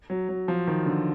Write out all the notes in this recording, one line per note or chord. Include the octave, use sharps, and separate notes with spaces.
F#3
F#3
F3
D#3
D3